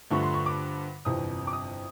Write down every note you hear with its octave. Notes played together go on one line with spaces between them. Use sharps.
G2 D3 F3 A3 C#6
C6
C#6
D6
G1 F2 C3 E3 D#6
D6
D#6